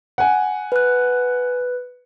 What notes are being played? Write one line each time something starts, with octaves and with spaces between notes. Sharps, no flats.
F#5 G#5
B4 F#6